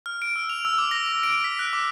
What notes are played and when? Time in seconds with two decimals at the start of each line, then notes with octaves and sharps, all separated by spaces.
0.06 F6
0.22 D7
0.36 E6
0.49 F7
0.65 E6
0.78 D6
0.91 A#6
1.06 A#6
1.23 D7
1.44 B6
1.59 F#6
1.73 D6